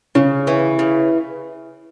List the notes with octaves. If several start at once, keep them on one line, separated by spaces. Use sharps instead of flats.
C#3 C#4
E3
C#3